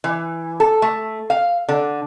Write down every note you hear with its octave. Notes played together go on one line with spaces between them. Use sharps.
E3
A4
A3
F5
D3